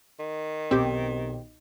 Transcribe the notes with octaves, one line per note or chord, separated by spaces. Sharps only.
D#3
B1 C4 G4